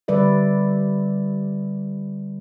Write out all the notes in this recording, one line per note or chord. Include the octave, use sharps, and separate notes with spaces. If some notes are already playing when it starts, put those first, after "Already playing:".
D3 G3 B4 D5 E5